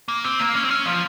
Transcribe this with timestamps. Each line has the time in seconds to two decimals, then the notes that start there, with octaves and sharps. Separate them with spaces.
0.08 A#3
0.24 C4
0.40 A#3
0.55 C#4
0.64 C4
0.71 C#4
0.86 F3